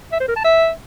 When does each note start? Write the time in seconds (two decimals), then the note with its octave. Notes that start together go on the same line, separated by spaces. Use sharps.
0.12 E5
0.20 C5
0.28 A#4
0.36 A5
0.44 E5